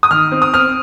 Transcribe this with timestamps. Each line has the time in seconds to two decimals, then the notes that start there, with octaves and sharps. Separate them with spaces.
0.03 D#6
0.11 D#3 F6
0.32 C4
0.42 D#6
0.54 C4 F6